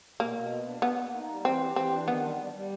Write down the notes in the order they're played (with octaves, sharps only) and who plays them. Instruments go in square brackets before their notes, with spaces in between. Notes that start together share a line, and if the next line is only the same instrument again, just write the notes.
[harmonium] B2 [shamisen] A#3
[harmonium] B2
B3
D4
[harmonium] A#3 [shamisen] B3
[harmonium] A#3
D#4
G3
[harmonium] E3 [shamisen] C4
[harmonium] G4
[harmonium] E3 [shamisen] C4
[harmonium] D4
[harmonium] D#3 [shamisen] B3
[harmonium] G3
G3
G3